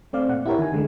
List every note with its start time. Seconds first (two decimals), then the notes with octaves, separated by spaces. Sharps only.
0.13 A3 C4 D5 F5
0.29 A#2 F#5
0.46 E4 G4 A#4 C#5
0.58 D#3 G#5
0.72 D3 G#3 A3